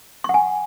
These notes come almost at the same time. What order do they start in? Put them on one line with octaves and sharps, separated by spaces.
C#6 F#5 G#5